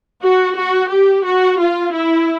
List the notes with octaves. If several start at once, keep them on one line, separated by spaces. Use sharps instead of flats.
F#4
F#4
G4
F#4
F4
E4